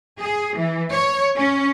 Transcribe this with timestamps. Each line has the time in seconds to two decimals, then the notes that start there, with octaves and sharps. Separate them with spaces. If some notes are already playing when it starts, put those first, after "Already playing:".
0.19 G#4
0.55 E3
0.91 C#5
1.38 C#4